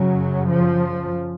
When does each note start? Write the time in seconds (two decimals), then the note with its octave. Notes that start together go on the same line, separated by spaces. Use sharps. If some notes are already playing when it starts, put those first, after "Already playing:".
Already playing: F#2 C#3 F#3
0.50 F3